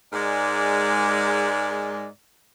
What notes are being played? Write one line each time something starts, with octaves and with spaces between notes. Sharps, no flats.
G#2 G#3 A#4 D5